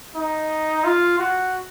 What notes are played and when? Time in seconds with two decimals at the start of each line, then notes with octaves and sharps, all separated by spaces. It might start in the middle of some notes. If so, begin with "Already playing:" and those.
0.15 D#4
0.85 F4
1.19 F#4